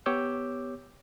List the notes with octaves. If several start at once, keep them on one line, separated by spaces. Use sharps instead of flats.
B3 G4 C#5 D6 E6 G6